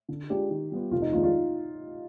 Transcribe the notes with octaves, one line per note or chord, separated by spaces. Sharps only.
D3
G#3 D4 F4 G4
D#3
G3 B3 F4
F1 F4
D#4
F2 D#3 G#3 D4 F4
F4